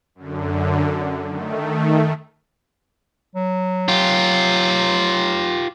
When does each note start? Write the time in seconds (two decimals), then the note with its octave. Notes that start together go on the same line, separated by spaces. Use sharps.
0.15 F#2 D3
1.25 D#3 A3
3.35 F#3
3.88 F4 G4